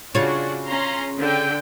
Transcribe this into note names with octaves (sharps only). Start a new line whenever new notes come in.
C#3 D4 F4 F#4 C#5
C#4 A#5 C6
D3 G5